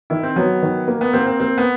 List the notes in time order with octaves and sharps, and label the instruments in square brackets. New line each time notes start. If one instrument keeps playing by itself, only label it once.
[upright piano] D#3 [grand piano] E4
[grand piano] C4
[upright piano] F#3 [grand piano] B3
[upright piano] D#3
A#3
[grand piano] B3
[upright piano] A#3 [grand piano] C4
[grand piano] C4
[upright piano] A#3 [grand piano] C4
[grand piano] B3